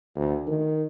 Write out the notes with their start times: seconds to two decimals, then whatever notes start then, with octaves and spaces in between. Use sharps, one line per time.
0.16 D2
0.47 D#3